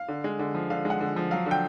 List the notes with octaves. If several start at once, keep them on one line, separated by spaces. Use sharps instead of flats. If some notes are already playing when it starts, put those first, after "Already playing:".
Already playing: F5
D3
G#3
D3
F3
D3 F5
G#3
F#5
D3
F3
F#3 F5
D3
G5